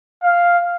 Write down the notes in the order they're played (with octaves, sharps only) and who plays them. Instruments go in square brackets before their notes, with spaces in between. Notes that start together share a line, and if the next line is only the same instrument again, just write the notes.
[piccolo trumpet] F5